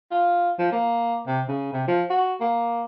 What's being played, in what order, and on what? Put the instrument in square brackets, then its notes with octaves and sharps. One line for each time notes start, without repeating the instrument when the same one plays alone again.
[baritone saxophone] F4
F3
A#3
C3
C#3
C3
F3
F#4
A#3